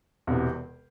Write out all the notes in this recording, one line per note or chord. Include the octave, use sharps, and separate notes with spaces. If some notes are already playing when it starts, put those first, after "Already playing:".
E1 E2 C3